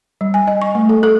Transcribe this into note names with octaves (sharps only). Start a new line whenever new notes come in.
G3
G#5
D#5
C#6
A3
A4
A4